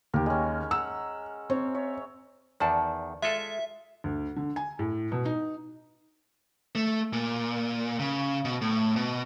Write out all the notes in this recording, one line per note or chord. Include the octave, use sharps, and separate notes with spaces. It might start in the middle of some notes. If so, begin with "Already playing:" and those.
D#2 G4 A#4
G#3 C#4
F#5 A#5 E6
C4 C#5
C#5 E5
E2 D#3 D5 A5 B5
G#3 F4 A4 E5
D2
D3
G#5
A2
B2
D#4
A3
A#2
C#3
B2
A2
B2